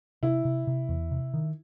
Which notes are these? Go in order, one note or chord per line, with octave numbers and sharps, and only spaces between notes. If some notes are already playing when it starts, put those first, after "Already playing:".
C3 E4
C3
C3
E2
C3
D#3